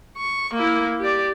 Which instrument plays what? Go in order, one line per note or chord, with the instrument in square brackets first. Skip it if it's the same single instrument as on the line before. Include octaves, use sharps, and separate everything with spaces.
[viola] C#6
A#3 E4
G4 D5